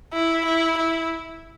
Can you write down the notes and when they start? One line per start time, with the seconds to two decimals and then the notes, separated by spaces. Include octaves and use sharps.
0.13 E4
0.45 E4
0.77 E4